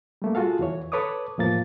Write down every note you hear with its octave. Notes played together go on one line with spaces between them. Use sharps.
G3 A3 A#3
F4 F#4 G#4 A4 F5
E2 E3 C#5
A4 B4 C#5 D6 D#6
E2 A2 F3 A#3 A6